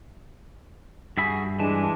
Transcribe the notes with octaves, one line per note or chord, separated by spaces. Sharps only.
G2 F#4 G#4 E5 B5
E3 G#3 D4 A5